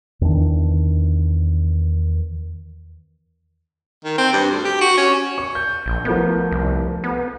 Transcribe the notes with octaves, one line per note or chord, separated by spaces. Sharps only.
E2 D#3 E3 D4
D#3
C4
G2
D2
G4
F#4
C#4
C#6
G6
A#1
F3 A3 B3 A#4
C2
B3